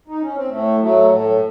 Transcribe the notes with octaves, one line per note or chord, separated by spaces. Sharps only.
D#4
C#4
C4
A2 A3
F#3 A3
A2 A3